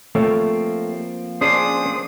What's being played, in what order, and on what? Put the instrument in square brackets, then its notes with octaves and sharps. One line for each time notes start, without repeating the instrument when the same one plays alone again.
[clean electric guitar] F3 A#3 C4 [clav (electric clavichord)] A3 C#5
[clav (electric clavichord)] C#4 G#4 D5 [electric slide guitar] D4 C5 [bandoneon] D#6